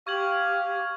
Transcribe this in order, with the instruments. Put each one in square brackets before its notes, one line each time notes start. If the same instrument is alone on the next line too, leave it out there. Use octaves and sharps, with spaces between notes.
[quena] G4 [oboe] F5 [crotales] C#6 G#6 F#7